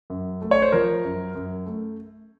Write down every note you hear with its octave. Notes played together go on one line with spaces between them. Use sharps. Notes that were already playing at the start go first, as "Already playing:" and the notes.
F#2
A3
C#5
C5
F3 A#4
F#2
F#2
A3